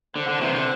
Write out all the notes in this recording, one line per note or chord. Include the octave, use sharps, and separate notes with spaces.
D3 C5
D3
C3 E3
D3